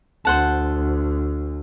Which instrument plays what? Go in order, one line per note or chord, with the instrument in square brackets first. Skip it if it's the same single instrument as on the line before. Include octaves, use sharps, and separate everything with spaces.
[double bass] D2 [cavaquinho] C5 F#5 A5